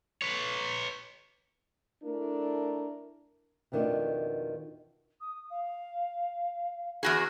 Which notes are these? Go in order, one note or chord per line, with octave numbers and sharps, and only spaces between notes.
B4 C#5
A3 D4 E4 A#4
F2 B2 D#3 A3 D4
D#6
F5
E2 F#4 G#4 C#6